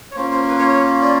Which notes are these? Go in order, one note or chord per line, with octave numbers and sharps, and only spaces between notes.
C#5
A#3 C#4 F4 C5
C5
B4
C#5
C#5
D5